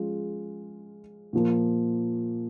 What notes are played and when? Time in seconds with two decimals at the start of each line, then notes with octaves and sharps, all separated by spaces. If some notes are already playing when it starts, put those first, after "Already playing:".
Already playing: F3 G#3 C#4 F4
1.33 A#2 F3 A#3